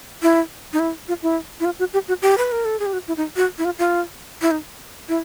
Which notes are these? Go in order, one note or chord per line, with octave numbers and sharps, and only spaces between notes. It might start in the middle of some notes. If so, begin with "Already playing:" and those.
E4
D#4
E4
F4
E4
E4
F4
F#4
G4
F#4
G4
B4
A#4
A4
G#4
G4
F#4
E4
D#4
F#4
E4
F4
F4
E4
D#4
E4